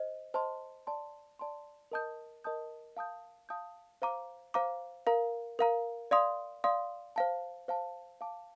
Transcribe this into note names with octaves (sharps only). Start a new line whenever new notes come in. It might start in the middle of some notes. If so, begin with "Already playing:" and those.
Already playing: C5 D#5
C5 D#5 A5 C6
D5 A5 C6
D5 A5 C6
A#4 D#5 A5 D#6 G6
A#4 D#5 A5 D#6 G6
F5 A5 D#6 G6
F5 A5 D#6 G6
C5 F5 A#5 D6
C5 F5 A#5 D6
A#4 F5 A#5
A#4 F5 A#5
D5 F5 C6 D#6
D5 F5 C6 D#6
C5 F5 A5
C5 F5 A5
F5 A5 D6